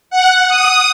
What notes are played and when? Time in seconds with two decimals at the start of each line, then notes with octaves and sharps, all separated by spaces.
0.10 F#5
0.48 D#6